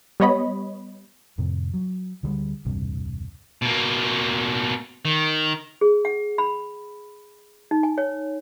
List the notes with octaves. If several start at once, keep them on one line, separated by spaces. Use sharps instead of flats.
G3 B3 C#5 D#5 B5
F2 A2 C3
F#3
D2 D3 G3 G#3
E1 C#2 G2 C3
B2 A#3
D#3
G#4
F#5
B5
D#4
G#5
C#5